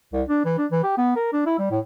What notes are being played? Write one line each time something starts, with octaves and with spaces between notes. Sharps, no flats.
C2
D4
E3
D4
E3
G4
B3
A#4
D4
E4
G3
A2